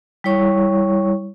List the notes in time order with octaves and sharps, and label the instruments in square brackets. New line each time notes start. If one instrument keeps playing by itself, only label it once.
[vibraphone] G3 E4 C#5 C#6